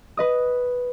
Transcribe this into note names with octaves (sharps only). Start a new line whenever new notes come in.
B4 D#5 D#6